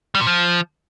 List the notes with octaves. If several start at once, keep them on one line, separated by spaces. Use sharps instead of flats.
G3
A#2
F3